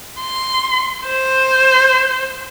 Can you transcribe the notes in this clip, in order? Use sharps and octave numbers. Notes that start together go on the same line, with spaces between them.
C6
C5